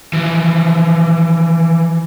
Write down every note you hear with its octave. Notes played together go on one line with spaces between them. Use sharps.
E3 F3